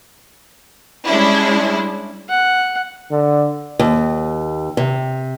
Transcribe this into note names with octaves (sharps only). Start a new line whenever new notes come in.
G3 G#3 C#4 D4 E4
F#5
D3
D#2
C3